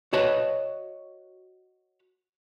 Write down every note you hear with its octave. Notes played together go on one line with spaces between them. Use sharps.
F#4 B4 C#5 D#5 A5 B5